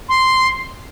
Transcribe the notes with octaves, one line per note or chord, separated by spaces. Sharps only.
C6